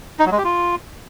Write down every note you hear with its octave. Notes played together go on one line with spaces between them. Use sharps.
D#4
F#3
G#3
G4
F4